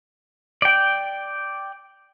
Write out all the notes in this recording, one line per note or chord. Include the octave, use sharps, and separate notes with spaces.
D5 G5